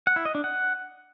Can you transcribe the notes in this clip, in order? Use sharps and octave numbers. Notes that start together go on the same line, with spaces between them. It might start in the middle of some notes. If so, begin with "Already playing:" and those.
F#5
E4
D#5
D4
F#5